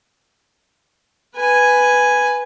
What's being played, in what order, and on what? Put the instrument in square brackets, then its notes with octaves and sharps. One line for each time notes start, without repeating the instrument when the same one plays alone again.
[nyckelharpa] B4 G#5